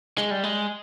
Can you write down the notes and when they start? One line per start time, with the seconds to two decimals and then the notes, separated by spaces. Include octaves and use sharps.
0.18 G#3
0.31 G3
0.43 G#3